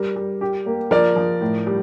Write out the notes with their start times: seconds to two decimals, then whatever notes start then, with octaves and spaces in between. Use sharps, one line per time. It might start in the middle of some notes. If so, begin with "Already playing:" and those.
Already playing: G3 A#4
0.16 G3
0.41 G4
0.66 A#3
0.91 F3 A#4 D5
1.16 F3
1.41 A2
1.67 G3